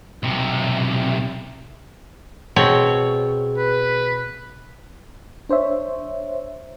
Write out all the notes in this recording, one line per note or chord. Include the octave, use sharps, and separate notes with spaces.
B1 C3
B2 C4 G#4 C#5
B4
D4 C5 C#5 E5